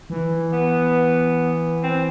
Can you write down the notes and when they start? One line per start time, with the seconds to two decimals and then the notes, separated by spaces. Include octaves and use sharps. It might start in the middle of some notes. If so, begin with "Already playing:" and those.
0.10 E3
0.53 B3
1.83 C4